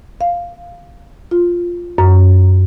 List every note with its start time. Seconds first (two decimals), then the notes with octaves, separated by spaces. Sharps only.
0.21 F5
1.31 F4
1.98 F#2